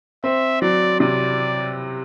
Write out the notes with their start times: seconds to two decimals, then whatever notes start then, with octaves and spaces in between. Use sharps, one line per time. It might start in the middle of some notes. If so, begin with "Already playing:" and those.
0.24 C4 E5
0.62 F#3 D5
1.00 C3 D5